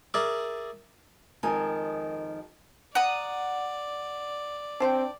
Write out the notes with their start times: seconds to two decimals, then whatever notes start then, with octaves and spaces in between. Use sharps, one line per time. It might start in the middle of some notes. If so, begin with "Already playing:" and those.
0.14 G#4 A#4 D5 E5
1.43 F2 D#3 F3 G#3 A#4 G#5
2.95 D5 F#5 A#5 D#6
4.80 C4 D4 C5 G5